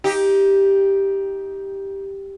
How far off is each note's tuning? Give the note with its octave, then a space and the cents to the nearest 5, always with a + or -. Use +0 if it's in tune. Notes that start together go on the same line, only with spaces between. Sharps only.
D#4 +25 G4 +0